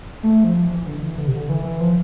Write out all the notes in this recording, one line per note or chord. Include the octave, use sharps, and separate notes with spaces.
A3
F3
E3
D3
E3
D3
C3
D3
E3
E3
F3